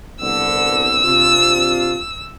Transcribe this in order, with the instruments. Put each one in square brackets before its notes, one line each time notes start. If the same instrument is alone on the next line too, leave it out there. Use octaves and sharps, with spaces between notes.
[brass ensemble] C2 D3 B3 [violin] E6
[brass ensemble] C3 D4 F4